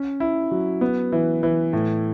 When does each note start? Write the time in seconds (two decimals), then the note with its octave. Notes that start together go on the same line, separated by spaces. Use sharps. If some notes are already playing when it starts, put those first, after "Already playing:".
Already playing: C#4
0.20 E4
0.51 F#3
0.81 B3
1.12 E3
1.43 E3
1.73 A2